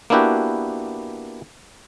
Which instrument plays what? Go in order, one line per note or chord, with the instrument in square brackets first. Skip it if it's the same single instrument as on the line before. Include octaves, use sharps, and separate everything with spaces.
[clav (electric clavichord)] A#3 B3 D4 E4 F#4 G4